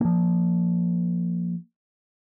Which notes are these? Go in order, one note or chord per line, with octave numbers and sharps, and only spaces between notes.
F3 A#3